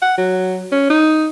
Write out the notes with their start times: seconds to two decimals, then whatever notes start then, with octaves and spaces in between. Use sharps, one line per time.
0.02 F#5
0.17 F#3
0.72 C#4
0.90 D#4